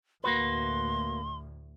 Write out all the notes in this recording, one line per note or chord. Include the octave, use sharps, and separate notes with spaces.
D2 A2 A#3 F#4 B4 C6